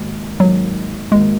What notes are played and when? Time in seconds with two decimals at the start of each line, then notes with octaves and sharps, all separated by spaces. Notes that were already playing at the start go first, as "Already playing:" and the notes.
Already playing: G#1 G#2 D#3 A#3 F#4
0.40 G#1 G#2 D#3 F#3 A#3 F#4
1.12 G#1 G#2 D#3 G#3 A#3 F#4